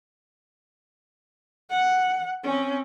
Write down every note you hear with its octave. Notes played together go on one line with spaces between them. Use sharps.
F#5
C4 C#4